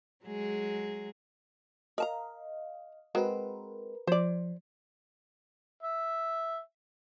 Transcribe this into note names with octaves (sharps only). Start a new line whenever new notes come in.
F#3 G#3 G#4
A#4 D#5 F5 A5 A#5
G#3 C4 F#4 A#4 B4
F3 C5 D5
E5